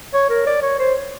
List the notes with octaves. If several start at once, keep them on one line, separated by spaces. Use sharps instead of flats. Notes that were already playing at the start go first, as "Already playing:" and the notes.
C#5
A#4
D5
C#5
C5